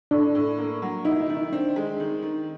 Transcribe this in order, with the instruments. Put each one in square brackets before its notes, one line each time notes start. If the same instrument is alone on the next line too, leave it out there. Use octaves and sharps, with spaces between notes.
[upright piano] A2 [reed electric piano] D4
[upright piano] A2
A#3
F#3
[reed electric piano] D#4 [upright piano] E4
[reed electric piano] D#4
[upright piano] D#3
[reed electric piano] D#4
[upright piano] C4 [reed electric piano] D4
[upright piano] G#3
D#3
D#3